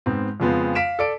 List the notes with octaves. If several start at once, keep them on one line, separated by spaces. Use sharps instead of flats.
G#2 B3 C4
F2 C#3 F3 G#3 B3 C4
F5 B6 D7 E7
A4 D5 D7